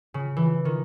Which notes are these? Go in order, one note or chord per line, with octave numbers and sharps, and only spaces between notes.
C#3
E3
D#3